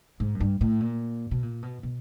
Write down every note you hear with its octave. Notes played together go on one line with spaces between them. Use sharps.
G#2
F#2
G2
A2
A#2
B2
A#2
B2
B2